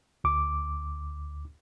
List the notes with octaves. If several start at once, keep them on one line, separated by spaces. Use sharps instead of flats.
D2 D6